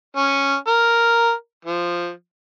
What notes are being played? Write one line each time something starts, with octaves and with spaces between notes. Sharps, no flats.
C#4
A#4
F3